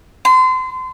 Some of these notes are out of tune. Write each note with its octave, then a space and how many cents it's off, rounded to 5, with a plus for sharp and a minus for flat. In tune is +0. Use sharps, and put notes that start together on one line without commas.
C6 -30